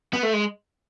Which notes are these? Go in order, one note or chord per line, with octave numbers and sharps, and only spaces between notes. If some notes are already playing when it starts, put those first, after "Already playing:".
B3
A3
G#3